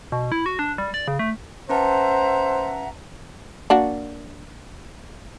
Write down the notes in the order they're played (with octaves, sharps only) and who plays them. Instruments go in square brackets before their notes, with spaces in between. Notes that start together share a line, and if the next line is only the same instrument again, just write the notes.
[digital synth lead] B2
E4
F#4
D4
G3
D5
C#3
A3
[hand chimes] C#4 B4 A5 [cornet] C5 [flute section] E5 F#5 A#5
[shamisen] A#3 D4 F#4